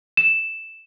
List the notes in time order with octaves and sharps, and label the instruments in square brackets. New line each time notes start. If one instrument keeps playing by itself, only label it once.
[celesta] E7